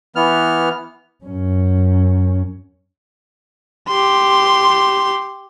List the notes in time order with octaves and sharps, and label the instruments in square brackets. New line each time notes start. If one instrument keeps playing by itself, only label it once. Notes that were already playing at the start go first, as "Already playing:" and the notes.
[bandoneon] E3 B3 F6
[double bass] F#2 C#4
[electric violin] G4 C6